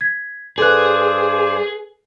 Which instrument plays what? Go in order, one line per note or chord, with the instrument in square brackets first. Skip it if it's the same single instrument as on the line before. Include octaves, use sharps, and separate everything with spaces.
[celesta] G#6 B6
[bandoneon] G2 C5 D5 [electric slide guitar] G#4 [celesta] A4 B4 F#6